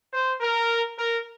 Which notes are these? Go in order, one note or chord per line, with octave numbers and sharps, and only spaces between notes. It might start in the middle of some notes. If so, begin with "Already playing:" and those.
C5
A#4
A#4